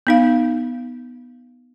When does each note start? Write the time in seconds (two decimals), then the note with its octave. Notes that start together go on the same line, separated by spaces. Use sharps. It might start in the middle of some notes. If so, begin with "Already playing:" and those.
0.07 B3 D#4 F5